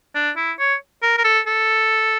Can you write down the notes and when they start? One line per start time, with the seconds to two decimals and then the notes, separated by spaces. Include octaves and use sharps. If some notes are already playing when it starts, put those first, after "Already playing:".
0.15 D4
0.36 E4
0.59 C#5
1.03 A#4
1.18 A#4
1.24 A4
1.47 A4